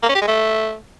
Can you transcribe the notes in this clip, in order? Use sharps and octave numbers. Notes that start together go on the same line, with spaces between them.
A#3
C#4
G4
G#3
A3